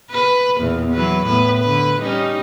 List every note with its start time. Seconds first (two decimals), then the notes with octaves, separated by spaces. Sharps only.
0.11 B4
0.58 E2 A#2 B3
0.92 E3 F#3 B4
1.26 A2 B3 B4
1.58 D3 B4
2.01 G3 C#4 D#4